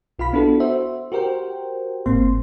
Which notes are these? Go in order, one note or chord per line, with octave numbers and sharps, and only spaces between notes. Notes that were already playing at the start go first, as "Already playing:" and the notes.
B1 F4 F5 B5 B6
B3 D4 E4 F#4 A4
F#4 C5 E5
F#4 G4 A#4 C5 G5
G1 A2 A#3 C4 C6